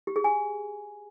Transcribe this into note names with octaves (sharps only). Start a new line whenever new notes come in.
G4
G#4
G#5